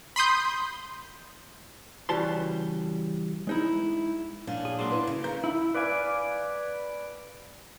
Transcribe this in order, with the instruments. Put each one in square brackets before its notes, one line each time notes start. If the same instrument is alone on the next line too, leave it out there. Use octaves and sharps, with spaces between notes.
[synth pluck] B5 C6 D#6 G6
[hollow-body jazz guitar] C#3 E3 G3 F#4 A5 C6
G#3 D#4 E4
[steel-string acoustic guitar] A#2 C#4 D4
[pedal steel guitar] G#4
[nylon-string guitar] F#3 G#3 A#3 [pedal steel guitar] C5 D5 C6
[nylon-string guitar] E4 B4
[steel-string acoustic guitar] C#3
[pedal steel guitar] C#4 D4 G6 [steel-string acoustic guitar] A#4
[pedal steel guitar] E4
B4 D5 F5 G#5